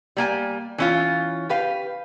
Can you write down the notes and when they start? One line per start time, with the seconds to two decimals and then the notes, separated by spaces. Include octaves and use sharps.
0.17 G3 A#3 G#5
0.78 E3 C#4 F4
1.49 G4 B4 F5